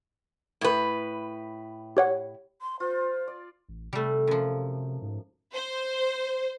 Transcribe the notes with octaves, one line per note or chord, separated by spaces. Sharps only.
A2 B4
G4 C#5 F#5
C6
F4 C5
D5
A1
C3 G3 A3
F#2 F3
G#2
C5